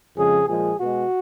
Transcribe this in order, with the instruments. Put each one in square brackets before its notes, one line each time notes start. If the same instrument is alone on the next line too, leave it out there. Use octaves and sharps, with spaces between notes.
[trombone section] F2 C#3 F3 G#3 G#4
A#2 F3 G#3 G#4
B2 G#3 F#4